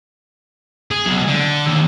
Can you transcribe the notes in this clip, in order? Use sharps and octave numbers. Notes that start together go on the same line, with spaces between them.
G#4
B1
D3
D#2